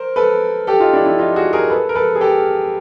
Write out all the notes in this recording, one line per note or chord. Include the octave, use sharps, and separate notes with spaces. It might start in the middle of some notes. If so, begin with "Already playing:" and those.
Already playing: A#4 C5
A4 B4
G4 A4
D#4 F4
D4 E4
D4 E4
D#4 F4
F#4 G#4
G#4 A#4
A4 B4
A#4
A4 B4
G#4
G4 A4